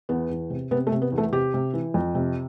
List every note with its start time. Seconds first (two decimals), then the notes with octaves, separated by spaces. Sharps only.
0.09 E2 B3
0.30 E2
0.50 C3
0.71 C3 B3
0.87 A3
0.92 C3
1.02 B3
1.12 E2
1.18 A3
1.32 C3 G4
1.54 C3
1.74 E3
1.94 F2
2.15 C3